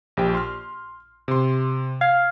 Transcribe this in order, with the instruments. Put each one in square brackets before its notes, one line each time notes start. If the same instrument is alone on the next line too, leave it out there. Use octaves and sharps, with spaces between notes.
[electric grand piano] A#1 G4 G5
C6 F6
C3 C6
[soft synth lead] F5 [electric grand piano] G#6